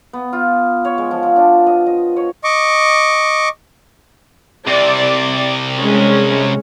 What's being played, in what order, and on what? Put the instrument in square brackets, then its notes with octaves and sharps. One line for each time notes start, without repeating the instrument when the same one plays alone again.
[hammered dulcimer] B3
F4
C#5
G#3
F3
F3
D4
D#5
D#5
C#5
[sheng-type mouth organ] D#5 C#6 D6
[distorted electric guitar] C2 C3 [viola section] D5
[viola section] G#3 C#4